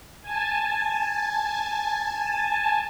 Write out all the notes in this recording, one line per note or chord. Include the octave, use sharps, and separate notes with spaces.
G#5 A5